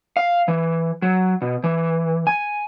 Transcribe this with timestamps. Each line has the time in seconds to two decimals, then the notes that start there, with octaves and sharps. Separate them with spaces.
0.17 F5
0.48 E3
1.02 F#3
1.42 B2
1.64 E3
2.27 G#5